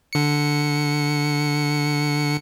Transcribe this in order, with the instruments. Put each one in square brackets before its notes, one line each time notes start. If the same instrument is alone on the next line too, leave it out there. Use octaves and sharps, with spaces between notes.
[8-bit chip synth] D3 C#7